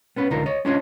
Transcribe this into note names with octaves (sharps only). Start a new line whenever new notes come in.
B3 C#4 B4
C#2 D3 D#4 F4 A#4
C#5 D#5
C#4 D4 F4 C5 C#5 D#5